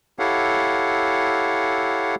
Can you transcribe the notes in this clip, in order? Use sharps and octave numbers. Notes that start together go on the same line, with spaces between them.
E4 G4 A4 C#5 F5 F#5